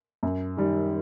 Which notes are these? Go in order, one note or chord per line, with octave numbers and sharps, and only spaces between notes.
F#2
D#3 G3